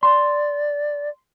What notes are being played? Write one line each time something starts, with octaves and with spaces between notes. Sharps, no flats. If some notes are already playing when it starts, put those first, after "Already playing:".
D5 C6